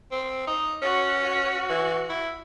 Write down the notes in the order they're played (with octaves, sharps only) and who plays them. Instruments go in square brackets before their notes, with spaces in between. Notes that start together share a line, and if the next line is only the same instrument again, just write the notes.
[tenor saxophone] C4
D#4
[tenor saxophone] C#4 [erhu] F#4
[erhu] F#4
[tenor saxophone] E3
E4